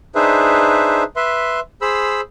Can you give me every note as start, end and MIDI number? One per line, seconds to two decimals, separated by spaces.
0.15 1.03 62
0.15 1.03 63
0.15 1.03 68
0.15 1.03 71
0.15 1.03 72
0.15 1.03 76
1.16 1.60 71
1.16 1.60 76
1.16 1.60 84
1.82 2.21 68
1.82 2.21 72
1.82 2.21 83
1.82 2.21 88